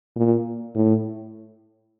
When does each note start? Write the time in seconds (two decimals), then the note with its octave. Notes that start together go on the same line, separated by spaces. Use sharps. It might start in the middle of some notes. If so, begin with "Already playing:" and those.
0.16 A#2
0.75 A2